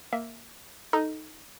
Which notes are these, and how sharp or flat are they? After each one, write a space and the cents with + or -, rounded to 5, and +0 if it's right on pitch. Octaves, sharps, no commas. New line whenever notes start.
A#3 +0 E5 +0
D#4 +0 A4 +5